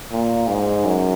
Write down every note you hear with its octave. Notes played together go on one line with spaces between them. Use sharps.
A#2
G#2
F#2